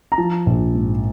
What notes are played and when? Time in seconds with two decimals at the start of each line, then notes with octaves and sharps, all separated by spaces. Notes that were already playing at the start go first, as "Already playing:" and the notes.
0.12 A#5
0.18 F3 A5
0.46 A#1
0.75 G#2